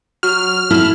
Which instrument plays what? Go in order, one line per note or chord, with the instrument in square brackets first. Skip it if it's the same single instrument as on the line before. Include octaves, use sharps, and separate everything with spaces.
[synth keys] F#3 F#4 [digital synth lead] F6
[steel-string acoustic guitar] E4 [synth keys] A4